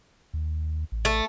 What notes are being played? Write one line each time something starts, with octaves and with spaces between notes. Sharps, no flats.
D#2
A1
A3